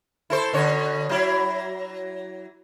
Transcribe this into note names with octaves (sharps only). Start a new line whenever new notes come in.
E4 A4 C5
B2 D3 C#5
F#3 E4